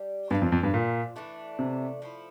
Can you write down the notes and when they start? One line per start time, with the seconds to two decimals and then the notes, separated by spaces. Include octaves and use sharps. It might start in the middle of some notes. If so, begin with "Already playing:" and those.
Already playing: G3 D4 G4
0.30 G2 F3 A#3 D4 F4
0.42 F2
0.52 F2
0.63 G2
0.74 A#2
1.16 E3 A3 D4
1.59 C3
2.02 F3 A3 E4